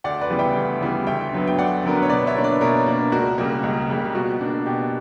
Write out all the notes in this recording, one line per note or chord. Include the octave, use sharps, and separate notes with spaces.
D2 D5 F#5
B4 D5
C#3 E3 G3 B3
E5 G5
D2
C#3 E3 G3 B3
D2 E5 G5
D3 F#3 B3
G5
D2 D5 F#5
D3 F#3 B3 A#4
B4
C#5
B2 B4 D5
C#5 E5
A#3 D4
B4 D5
B2 A#4 C#5
A#3 D4
C#2 F#4 A#4
C#3 G3 A#3
C#2
C#3 G3 A#3
B2 F#4
A#3 D4
B2 G4